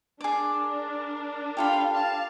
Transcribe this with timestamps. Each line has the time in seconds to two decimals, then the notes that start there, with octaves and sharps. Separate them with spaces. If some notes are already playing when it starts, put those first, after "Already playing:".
0.21 D4 G#4 A#4 D5
1.57 F4 G4 A4 F5 B5
1.93 F5 A5